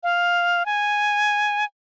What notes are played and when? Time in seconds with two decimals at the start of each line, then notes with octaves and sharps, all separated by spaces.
0.03 F5
0.66 G#5